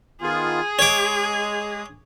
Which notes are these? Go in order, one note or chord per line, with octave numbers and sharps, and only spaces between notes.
D#3 B3 F4 G#4
G#3 C#5 D6